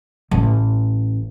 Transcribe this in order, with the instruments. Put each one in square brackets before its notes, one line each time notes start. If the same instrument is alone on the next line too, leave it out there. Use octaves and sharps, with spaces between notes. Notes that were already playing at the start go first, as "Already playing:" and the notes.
[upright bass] A1